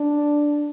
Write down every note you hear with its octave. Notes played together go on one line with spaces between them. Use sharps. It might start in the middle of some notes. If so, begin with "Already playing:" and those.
Already playing: D4